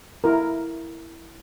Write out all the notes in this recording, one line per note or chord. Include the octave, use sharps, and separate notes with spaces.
E4 A#4